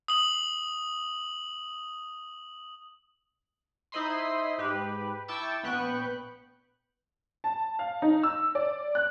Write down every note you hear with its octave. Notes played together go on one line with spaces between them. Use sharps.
D#6 F#7
D#4 E4 C5 D#5 B5 C6
G#2 G4 B4
E4 G5 A5 C#6 D6 E6
A#1 B3 B4 G5 C#6 F#6
A5
F5
D#4
E6
D5
F#6